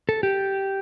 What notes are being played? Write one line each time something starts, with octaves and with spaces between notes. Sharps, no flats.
A4
G4